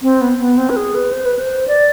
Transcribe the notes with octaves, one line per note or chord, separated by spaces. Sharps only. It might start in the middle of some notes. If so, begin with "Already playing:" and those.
C4
B3
B3
C4
B4
G#4
B4
C5
B4
C5
D5